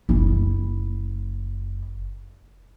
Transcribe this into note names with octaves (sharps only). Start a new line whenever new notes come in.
F#1 E4